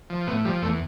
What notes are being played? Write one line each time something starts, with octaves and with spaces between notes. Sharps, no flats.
F3
A2 B3
F3 G3
E2 A3